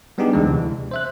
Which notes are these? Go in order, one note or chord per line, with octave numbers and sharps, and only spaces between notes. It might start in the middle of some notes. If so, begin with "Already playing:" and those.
G3 B3 D4 D#4 G4 G#4
D2 E3 G#3 D4
C3
C5 E5 F#6